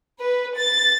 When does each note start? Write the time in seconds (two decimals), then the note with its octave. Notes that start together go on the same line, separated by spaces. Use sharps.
0.20 B4
0.57 A6